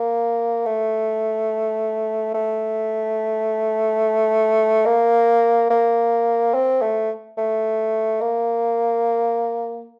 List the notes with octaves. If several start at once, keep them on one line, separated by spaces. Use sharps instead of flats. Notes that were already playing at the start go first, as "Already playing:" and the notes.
Already playing: A#3
A3
A3
A#3
A#3
C4
A3
A3
A#3